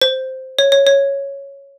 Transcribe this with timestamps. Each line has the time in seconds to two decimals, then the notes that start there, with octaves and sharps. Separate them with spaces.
0.01 C5
0.59 C#5
0.72 C#5
0.87 C#5